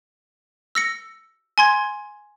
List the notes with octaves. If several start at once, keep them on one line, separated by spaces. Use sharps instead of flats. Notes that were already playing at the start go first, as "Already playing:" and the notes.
E6 A#6 C#7
G#5 C6 G#6